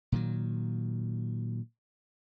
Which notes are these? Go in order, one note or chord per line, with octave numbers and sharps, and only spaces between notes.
A#2 D#3 F#3